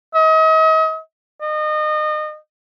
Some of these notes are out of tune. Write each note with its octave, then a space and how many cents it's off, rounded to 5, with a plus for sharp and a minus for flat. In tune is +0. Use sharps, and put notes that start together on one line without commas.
D#5 +40
D#5 -30